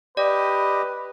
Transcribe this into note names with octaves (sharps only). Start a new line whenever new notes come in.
G4 B4 D5 D#5